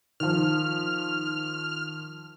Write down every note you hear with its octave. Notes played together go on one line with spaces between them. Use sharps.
D#3 F3 F6